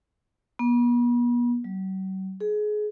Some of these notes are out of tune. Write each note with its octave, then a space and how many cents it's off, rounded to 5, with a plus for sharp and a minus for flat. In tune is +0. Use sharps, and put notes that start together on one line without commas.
B3 -40
F#3 +45
G#4 +25